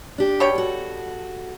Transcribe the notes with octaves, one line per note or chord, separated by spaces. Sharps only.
D4 G4
B2 C#5 G5
F#4 A4